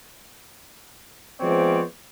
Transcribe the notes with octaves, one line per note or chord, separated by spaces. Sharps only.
F3 G#3 B3 C4 C#5 D5